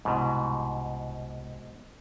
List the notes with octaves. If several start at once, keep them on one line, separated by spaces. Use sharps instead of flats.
C2 G#2 B2